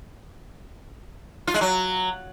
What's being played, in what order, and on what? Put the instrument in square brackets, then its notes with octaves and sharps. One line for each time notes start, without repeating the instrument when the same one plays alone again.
[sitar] F4
G#3
F#3